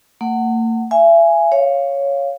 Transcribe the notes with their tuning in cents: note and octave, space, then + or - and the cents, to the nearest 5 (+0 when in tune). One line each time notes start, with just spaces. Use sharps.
A#3 -45 F#5 +10
E5 +35 G#5 +0
C#5 +0 F5 +0